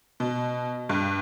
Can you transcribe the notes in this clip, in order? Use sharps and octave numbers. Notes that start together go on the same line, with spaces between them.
B2
G2